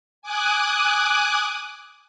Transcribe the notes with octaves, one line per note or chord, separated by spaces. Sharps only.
G#5 D6 D#6 F#6